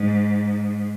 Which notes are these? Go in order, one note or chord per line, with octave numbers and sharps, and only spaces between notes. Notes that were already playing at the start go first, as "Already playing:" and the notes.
Already playing: G#2